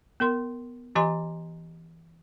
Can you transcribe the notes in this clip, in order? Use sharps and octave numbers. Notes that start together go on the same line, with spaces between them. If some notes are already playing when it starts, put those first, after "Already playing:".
B3 A#4 C6
E3 G4 D#5 G#5 A#5 C6